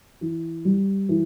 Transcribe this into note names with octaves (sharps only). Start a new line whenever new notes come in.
E3
G3
E3